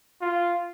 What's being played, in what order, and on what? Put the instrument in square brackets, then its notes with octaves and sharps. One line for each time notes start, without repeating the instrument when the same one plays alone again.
[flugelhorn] F4